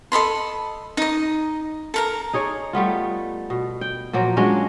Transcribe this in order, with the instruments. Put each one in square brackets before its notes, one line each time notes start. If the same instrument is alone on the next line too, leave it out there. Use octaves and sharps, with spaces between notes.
[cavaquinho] A4 D#5 B5 C6
D#4 D#5
A4 A#4 A#5
[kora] D#4 G#4 C#5 D5
G3 A3 B3 F4
B2
G5
A#2 F3 F#3 A#3
F#3 G#3 C#4 D4